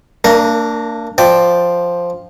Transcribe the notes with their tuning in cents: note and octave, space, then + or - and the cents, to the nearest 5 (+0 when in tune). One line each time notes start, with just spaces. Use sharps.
A#3 -35 D4 +0 A#4 +0
F3 +0 D5 +0 G5 +0